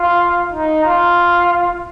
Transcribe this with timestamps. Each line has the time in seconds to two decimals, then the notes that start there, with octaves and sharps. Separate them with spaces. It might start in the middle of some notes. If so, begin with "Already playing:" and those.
Already playing: F4
0.52 D#4
0.85 F4